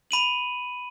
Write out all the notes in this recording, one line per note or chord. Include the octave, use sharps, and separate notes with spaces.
B5 D#7 F#7